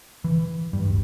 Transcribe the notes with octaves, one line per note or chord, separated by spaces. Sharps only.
E3
G2
D1